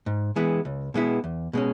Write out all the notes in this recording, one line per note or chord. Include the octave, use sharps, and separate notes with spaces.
G#2
E3 G#3 B3 E4
C#2
B2 G#3 B3 E4
E2
B2 G#3 C#4